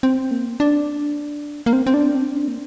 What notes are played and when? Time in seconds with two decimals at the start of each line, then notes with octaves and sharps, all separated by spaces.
0.03 C4
0.31 A#3
0.60 D4
1.66 A#3
1.73 C4
1.87 C4
1.94 D4
2.15 C4
2.37 D4
2.48 A#3